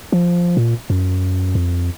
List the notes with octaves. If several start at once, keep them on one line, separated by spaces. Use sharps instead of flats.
F3
A#2
F#2
F2